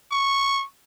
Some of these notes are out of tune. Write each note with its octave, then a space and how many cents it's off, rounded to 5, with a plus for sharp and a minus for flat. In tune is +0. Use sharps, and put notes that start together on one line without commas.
C#6 -5